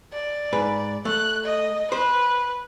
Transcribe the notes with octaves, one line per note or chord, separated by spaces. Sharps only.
D5
G#2 B4
A3 F#6
D#5
B4 C5